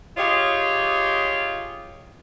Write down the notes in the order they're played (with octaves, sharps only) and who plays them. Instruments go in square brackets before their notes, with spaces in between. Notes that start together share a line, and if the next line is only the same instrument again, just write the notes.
[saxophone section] F4 G4 G#4 C#5 D#5